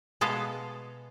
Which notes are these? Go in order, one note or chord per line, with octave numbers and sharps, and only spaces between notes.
B2 G#3 B3 A4 F5